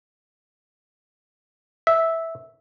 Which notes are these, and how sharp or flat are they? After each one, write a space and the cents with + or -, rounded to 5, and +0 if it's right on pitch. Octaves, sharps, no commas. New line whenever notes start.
E5 -10